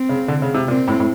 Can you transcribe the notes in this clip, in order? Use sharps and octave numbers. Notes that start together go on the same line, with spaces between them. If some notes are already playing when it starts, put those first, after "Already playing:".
Already playing: C4
C#3
D3
C#3
C3
A#2 C4
A2
A2